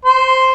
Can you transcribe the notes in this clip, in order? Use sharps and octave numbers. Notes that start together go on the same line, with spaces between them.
C5